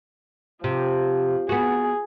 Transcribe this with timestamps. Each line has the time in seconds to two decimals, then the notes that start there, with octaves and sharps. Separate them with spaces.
0.64 C3 F3
1.49 B3 F#4 G#4